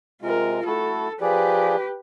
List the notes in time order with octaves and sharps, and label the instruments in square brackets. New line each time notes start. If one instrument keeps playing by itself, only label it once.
[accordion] C3 G#3 [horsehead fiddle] F4 A#4
[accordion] A3 E4 F#4 [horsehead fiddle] A4
[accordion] F3 G#4 D5 [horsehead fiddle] G4 B4